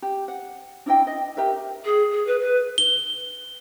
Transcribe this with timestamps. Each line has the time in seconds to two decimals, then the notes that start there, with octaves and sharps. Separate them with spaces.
0.02 G4
0.28 F#5
0.86 D4 E4 D#5 G5
1.07 D#5
1.37 G4 A#4 E5
1.85 G#4
2.12 G#4
2.27 B4
2.41 B4
2.78 G7